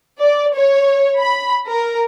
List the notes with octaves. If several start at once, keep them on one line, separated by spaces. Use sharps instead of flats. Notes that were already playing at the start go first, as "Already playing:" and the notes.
D5
C#5
B5
A#4